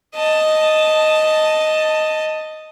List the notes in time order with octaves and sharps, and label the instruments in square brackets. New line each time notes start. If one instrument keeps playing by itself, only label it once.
[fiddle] D#5 A5